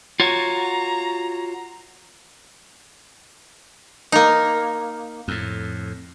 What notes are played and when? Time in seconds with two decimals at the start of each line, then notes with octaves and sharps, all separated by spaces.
0.20 F4 F#4 C#5 A#5
4.12 A#3 D#4
5.28 F2 A2